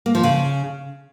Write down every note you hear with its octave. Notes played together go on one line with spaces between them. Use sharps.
A#3
F3
C#3